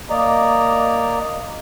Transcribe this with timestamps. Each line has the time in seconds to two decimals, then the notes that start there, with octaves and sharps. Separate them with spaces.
0.10 A#3 D5 D#5 A#5